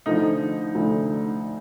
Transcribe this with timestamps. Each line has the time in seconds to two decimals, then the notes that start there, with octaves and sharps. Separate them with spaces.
0.06 D2 D3 F3 D#4
0.75 D2 D3 F3